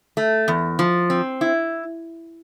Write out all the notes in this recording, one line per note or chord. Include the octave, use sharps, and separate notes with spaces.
A3
E2
F3
C4
E4